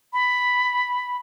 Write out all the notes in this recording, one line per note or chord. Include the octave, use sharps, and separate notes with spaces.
B5